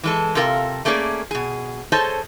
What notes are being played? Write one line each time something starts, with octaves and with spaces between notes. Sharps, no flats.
E3 G#3 A4
C3 F4 A4 A#4 F5
A3 A#3 C#4 G#4 D5
B2 G#4
G#4 A4 C5 C#5 D#5 A5